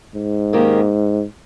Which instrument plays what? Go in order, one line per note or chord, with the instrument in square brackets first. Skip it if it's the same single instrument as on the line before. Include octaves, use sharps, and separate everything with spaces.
[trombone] G#2
[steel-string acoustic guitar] D#3 A#3 C#4 G4